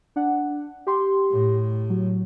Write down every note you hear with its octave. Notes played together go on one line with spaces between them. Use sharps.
D4 F#5
G4 C6
A2
F#3